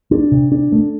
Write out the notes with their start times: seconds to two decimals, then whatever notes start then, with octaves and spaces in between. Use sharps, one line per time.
0.11 D4
0.32 C3
0.52 D4
0.72 A3